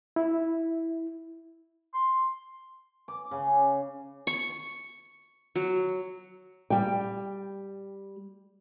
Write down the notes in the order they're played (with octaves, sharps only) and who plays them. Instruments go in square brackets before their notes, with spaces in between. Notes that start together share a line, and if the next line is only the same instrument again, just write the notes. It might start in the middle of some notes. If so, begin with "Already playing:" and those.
[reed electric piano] E4
[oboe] C6
[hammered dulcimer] D6
C#3
[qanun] C#6
F#3
[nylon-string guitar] G3 G5